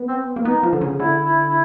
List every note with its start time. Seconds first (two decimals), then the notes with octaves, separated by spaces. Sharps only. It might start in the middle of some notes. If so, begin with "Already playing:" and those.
Already playing: B3
0.08 C4
0.36 A#3
0.44 B3 D#4
0.63 F3
0.73 D3
0.81 C#3
1.00 D3 E4
1.24 E4
1.48 E4